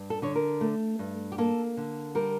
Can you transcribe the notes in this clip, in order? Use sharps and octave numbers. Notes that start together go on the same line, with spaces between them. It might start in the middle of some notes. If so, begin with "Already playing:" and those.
Already playing: G2
A4
D3 C#5
A#4
A3
G2
G4
A#3 A4
D3
G3 A#4